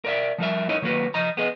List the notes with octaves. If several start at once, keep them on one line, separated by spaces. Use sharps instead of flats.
A#4 D5 E5
F3 G3 A#4 E5
D#4 E4 A#4 C#5 D#5
D#3 F#3 A#3 F#4 B4
F3 D#5 A#5
B3 G#4 D#5